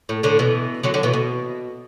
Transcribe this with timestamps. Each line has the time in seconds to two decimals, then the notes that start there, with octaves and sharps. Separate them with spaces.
0.09 A2
0.23 A2 D3
0.39 B2 E3
0.83 D3 F#3
0.94 D3 F#3
1.03 B2 E3
1.13 B2